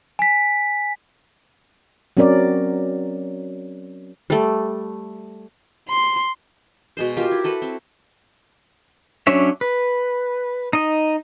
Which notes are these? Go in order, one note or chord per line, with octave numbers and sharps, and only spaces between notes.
G#5 B6
F#3 C4 C#4 A#4 D5
G3 A3
C6
B2 G#3 C5
F4 G4 A#4
E4
F#4 A4 B4 B5
C4
F#3 C#4 D4 C#5 E5
B4
D#4 D#5